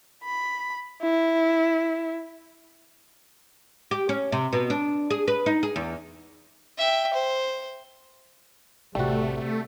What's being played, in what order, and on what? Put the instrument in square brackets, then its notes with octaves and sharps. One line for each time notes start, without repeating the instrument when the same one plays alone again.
[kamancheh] B5
E4
[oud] G4
C#4
C3
B2
D4
G#4
B4
D#4
G#4
E2
[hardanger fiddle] E5 G5
C5
[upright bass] A1 [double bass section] C3 [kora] G3 F#4 [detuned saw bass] A3